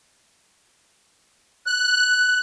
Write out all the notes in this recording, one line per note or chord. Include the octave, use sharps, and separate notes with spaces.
F#6